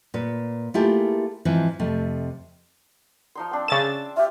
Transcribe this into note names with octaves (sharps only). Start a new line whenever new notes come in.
A#2 B4
A3 A#3 E4 F4 G4 G#4
G#2 E3 F3 C4
F2 C3 A3
F3 D#4 C6
C4 D4
C#3 E5 D6 A6 E7
F4 G4 E5